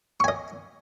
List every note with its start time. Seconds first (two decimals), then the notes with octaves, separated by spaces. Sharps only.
0.20 C#6
0.24 G#5
0.28 D#5